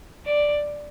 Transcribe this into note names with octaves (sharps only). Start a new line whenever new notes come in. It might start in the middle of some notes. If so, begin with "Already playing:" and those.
D5